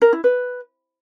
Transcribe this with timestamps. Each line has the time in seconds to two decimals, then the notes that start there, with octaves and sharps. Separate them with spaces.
0.02 A#4
0.13 E4
0.24 B4